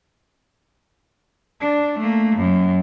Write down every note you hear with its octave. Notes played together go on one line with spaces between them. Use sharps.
D4
A3 A#3
F#2